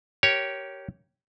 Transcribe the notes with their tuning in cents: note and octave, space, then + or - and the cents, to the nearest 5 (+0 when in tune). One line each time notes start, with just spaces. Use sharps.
G4 -15 A#4 +10 C#5 +0